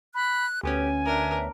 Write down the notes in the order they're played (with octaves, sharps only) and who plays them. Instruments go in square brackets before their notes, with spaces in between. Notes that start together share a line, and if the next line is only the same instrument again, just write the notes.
[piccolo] B5 [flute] F#6
[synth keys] D2 B3 C#4 [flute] G4 [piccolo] G#5
[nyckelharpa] D4 A#4 [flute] E5